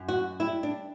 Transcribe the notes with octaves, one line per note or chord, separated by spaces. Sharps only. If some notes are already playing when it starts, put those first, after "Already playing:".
Already playing: F#2
F#4
G3 E4
D4